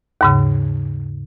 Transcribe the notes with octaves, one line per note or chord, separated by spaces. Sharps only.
D#2 G#2 C#3